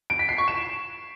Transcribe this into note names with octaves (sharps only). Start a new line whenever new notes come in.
D7
B6
C7
C#6
E7